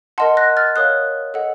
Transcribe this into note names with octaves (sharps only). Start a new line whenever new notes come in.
A#4 D#5 F#5 A5 C6
F#6 A#6
F6 A6
A#4 C#5 F5 D#6 F#6
A4 D#5 F#5